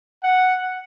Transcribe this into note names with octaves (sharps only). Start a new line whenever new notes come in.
F#5